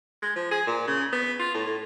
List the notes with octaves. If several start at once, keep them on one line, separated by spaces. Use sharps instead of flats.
G#3
F3
G#4
A#2
C#3
B3
F4
A2
A2